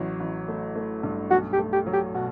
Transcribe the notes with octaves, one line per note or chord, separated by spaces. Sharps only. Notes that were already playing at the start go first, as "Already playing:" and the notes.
Already playing: A1 F#3
A1
A3
A3
G2
B1 F#4
G4
A3
G4
F#3
G4
B2 F#4